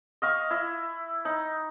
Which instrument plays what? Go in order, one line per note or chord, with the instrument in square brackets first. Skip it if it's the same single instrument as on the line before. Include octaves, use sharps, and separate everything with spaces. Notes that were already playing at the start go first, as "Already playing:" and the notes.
[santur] D#5 F5 C#6
E4
D#4